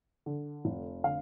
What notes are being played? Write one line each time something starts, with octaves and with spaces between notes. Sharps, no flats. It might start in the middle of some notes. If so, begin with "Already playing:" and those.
D3
F1
D3 F5